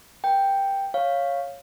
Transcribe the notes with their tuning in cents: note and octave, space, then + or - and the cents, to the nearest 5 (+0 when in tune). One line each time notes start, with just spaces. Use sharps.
A#4 +35 G5 +0
C#5 +0 F5 +0 C#6 +0